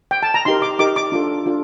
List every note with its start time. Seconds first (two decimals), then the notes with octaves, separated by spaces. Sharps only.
0.11 G5
0.23 A5
0.34 A#5
0.45 D#4 G4 A#4 C6
0.62 D6
0.79 D#4 G4 A#4 D6
0.96 D6
1.12 D4 F4 A4
1.46 D4 F4 A4